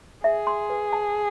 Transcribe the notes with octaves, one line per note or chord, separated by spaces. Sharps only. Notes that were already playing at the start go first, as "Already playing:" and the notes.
G#4 E5
C6
B4
A5